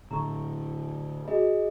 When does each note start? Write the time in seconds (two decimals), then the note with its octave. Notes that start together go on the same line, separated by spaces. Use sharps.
0.11 A2 D3 A#5 C#6
1.28 F#4 G#4 D#5 B5